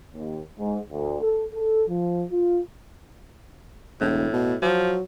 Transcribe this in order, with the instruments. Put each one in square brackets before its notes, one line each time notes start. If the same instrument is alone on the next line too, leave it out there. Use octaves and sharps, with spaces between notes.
[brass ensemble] D#2
G#2
D2
A4
A4
F3
F4
[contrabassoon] E1 [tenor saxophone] A2
[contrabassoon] B2
[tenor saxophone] F3 [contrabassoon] F#3